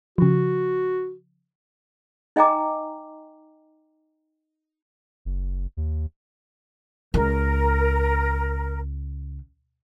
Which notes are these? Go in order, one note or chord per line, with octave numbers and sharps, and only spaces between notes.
C#3 F3 F#4
D#4 D#5 G5 G#5 A#5 D6
F#1
D#2
C#2 A#4